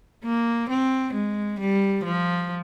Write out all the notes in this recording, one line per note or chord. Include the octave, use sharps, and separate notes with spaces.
A#3
C4
G#3
G3
F3